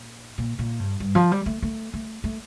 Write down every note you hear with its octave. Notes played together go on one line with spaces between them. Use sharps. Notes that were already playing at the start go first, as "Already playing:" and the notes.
Already playing: A#2
A#2
A#2
G2
G2
F3
G3
A3
A3
A3
A3